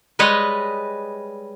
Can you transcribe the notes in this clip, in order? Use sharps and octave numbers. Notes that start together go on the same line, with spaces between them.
G3 G#3 B4 C#5 D#5